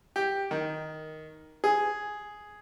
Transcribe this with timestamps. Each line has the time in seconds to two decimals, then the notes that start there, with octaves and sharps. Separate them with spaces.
0.16 G4
0.51 D#3
1.64 G#4